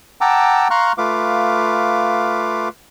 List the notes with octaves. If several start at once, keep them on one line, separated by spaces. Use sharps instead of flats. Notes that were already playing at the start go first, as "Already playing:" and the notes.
F#5 G5 A5 A#5 D6 E6
F5 A#5 C6 C#6 F6 F#6
A3 F4 B4 F5 D6